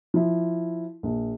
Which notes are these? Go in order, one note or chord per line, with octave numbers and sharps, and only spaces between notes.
F3 E4
A#1